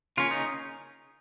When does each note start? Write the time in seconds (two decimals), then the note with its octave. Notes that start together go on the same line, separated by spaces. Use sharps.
0.17 C#3 A#3 C#4 F4
0.31 D#4